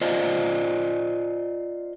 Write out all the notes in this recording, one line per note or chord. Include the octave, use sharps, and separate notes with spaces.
F4 C5 D5 D#5